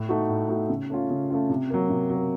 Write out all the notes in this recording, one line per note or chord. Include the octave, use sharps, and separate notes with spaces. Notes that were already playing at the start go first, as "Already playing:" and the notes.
Already playing: A2
A3 D#4 F#4
A2
A3 D#4 F#4
C#3
A3 C#4 F4
C#3
A3 C#4 F4
C3
F#3 A#3
C3
F#3
A#3